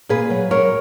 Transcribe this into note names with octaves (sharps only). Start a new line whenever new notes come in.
A#2 G#4 B4
F#3
F#3 A#4 C#5